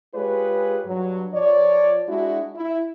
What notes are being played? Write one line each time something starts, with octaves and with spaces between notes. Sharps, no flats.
G#3 F4 G4 G#4 B4 C#5
G2 F#3
F3 C#5 D5
G#3 D4 E4 F#4
E4